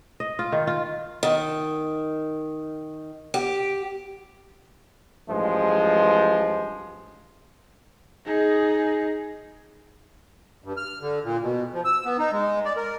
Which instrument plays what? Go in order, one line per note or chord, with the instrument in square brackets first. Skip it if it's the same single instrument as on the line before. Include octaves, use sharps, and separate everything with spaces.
[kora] D#5
F4
D#3
F4
[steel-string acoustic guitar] D#3
G4
[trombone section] A1 G2 F3 G#3
[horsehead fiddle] D#4 G#4
[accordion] G2
F6
D3
A#2
B2
F3
E6
B3
D#4
G#3
D5
A#4